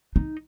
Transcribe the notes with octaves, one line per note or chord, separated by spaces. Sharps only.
D#4